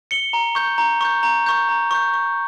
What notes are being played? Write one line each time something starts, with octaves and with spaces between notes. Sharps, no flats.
C#7 G7
A#5
C#6 G6
A#5
C#6 G6
A#5
C#6 G6
A#5
C#6 G6
C#6